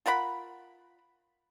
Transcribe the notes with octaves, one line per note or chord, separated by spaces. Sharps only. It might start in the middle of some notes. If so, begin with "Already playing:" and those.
F4 A#4 F#5 B5